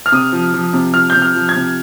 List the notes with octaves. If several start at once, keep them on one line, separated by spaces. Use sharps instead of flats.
F6
C3 D#6
F3
F3
C3
F3 F6
G6
C3
F6
F3
G#6
C3